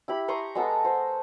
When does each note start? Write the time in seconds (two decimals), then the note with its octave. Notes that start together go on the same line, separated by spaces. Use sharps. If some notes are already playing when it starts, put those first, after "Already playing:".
0.08 E4 G4 B5
0.28 A#5 C6 C#6 D#6
0.55 G#3 B3 A4 A#5
0.85 C5